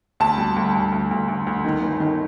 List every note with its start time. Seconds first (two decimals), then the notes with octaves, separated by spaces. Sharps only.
0.20 D2 A5
0.38 G3
0.56 D2
0.74 D2
0.92 D2
1.11 D2
1.28 D2
1.47 D2
1.64 D#3
1.82 G1
2.00 D#3